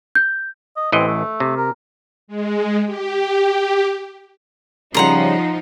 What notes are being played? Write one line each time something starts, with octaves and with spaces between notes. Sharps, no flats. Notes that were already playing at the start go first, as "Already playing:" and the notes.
G6
D#5
A1 E3 C4 D#5
A3
C3
A#4
G#3
G4
C#3 F3 G3 D#4 F#5 A#5 C6